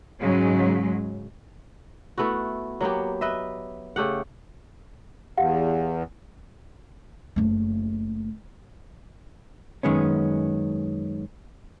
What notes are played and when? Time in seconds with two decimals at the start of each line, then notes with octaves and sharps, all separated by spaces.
0.20 G#2 C#3 F#3 G#3
2.18 A3 B3 E4 F#4
2.81 F#3 A#3 B3 G4
3.21 B4 D#5 E5
3.96 C#3 A3 G4 F#5
5.38 E2 G4 F5 F#5
7.36 F#1 A3
9.83 F#2 D#3 G#3 B3 C#4